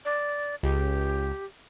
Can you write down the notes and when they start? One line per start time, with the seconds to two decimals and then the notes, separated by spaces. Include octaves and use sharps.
0.05 D5
0.63 C#2 G4